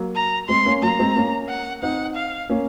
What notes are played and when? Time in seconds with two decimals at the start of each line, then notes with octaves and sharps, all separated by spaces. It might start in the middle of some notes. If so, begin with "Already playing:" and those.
Already playing: F#3 A#3
0.15 A#5
0.49 G#3 C4 C6
0.65 A#3 C#4
0.82 F#3 A#3 A#5
0.99 G#3 C4
1.16 A#3 C#4
1.49 F#5
1.83 C4 D#4 F#5
2.16 F5
2.49 A#3 C#4